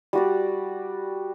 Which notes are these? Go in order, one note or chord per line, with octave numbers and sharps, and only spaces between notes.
G3 F#4 D5